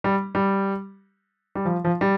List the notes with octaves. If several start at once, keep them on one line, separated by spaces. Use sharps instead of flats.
G3
G3
G3
F3
F3
G3